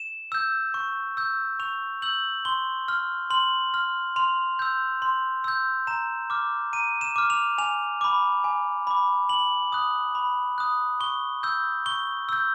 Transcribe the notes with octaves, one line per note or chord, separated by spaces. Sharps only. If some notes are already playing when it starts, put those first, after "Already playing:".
Already playing: E7
E6 G6
C#6
E6 G6
C#6 F7
E6 G6 F#7
C6 G7
F6
C6 F#7
F6
C6 F7
E6 G6
C6
E6 G6
A#5 E7
D6 F6
A#5 D#7
E7
D6 F6
F7
G#5 F7
B5 D6
G#5
B5 D6
B5 F#7
D#6 F#6
B5
D#6 F#6
C#6 G7
E6 G6
C#6 G7
E6 G6